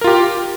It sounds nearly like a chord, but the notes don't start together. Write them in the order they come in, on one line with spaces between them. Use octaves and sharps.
A#4 F4 G4